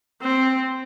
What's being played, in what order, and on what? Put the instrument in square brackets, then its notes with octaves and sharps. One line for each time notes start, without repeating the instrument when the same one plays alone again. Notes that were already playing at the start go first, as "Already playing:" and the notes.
[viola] C4